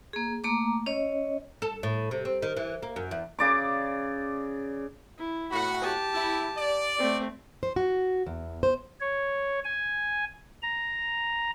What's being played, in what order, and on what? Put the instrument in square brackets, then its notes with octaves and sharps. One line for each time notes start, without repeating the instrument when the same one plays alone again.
[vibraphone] A#3 G#4
A3 A#3 A#5 D6
C#4 C#5 D#5
[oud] A4
A2
C3
C4
D#3
E3
A#3
F#2
E2
[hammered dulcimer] C#3 D5 D6
[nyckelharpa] E4
[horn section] A2 F#4 [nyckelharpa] F#5 B5
[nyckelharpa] G4 A5
[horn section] E4
D5
[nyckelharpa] A3 C4
[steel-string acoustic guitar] C5
F#4
E2
C5
[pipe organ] C#5
G#5
A#5